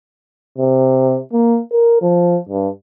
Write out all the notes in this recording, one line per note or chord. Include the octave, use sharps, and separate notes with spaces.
C3
A#3
A#4
F3
G2